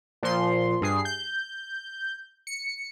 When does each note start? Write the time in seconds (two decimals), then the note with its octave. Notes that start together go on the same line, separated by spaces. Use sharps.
0.23 A#2 F3 C6
0.81 G2 G#4 C7
1.05 G6
2.47 C#7